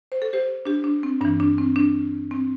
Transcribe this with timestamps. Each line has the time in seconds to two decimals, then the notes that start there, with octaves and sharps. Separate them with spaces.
0.12 C5
0.22 A4
0.33 G4 C5
0.65 D4 G4
0.84 D4
1.03 C4
1.21 G2 E3 D4
1.40 D4
1.58 C4
1.76 D4
2.31 C4